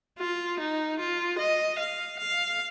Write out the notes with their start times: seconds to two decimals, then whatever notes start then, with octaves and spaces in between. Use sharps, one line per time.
0.19 F4
0.60 D#4
1.00 F4
1.39 D#5
1.79 F5
2.19 F5